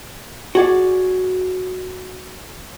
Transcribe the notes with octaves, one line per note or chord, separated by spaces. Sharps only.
F#4 G#4 D5